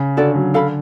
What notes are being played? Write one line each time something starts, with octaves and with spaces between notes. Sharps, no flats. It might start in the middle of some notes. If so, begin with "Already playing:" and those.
Already playing: C#3
D3 C#4 F#4 A4 D5
F#3
D3 A4 F5 B5